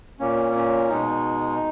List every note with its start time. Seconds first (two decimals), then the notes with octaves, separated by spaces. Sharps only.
0.20 A#2 A#3 C#4
0.55 C#4
0.89 B2 G#3 D#4